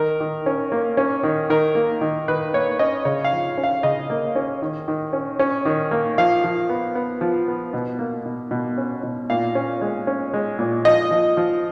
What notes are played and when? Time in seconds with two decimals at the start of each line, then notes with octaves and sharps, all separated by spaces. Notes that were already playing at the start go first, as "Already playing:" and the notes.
Already playing: D#3 A#4
0.20 D#3
0.46 C#4
0.72 A#3
0.97 C#4
1.23 D#3
1.50 D#3 A#4
1.75 A#3
2.01 D#3
2.28 D#3 B4
2.54 A#3 C#5
2.79 C#4 D#5
3.05 C#3 C#5
3.24 F5
3.32 F3
3.58 C#4
3.64 F5
3.83 C#3 D#5
4.10 A#3
4.35 C#4
4.62 D#3
4.88 D#3
5.13 C#4
5.39 C#4
5.65 D#3
5.91 A#3
6.18 F3 F5
6.44 F3
6.69 B3
6.95 B3
7.21 F3
7.48 B3
7.74 B2
7.99 A#3
8.26 B2
8.51 B2
8.78 C#4
9.03 B2
9.30 A#2 F5
9.55 C#4
9.81 G#3
10.07 C#4
10.34 G#3
10.59 A#2
10.85 F3 D#5
11.11 F3
11.37 F3